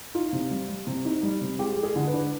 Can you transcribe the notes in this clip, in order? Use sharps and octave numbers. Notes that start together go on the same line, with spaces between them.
D#4 F4
C3
G3
G3
C3
D#4
G3
C3
G#3 G4
G#3
G#4
D3
B4
D4